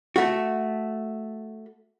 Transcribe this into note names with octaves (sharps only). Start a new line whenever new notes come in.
A3 F#4